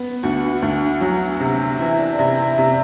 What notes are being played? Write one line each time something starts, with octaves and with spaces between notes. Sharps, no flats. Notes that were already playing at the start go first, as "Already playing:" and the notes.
Already playing: B3
D2 F#4
D2
F#3
C3
E3 E4
D4
C3 E4
E4
C3 D4